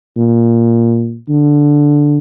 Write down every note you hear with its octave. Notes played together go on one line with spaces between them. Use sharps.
A#2
D3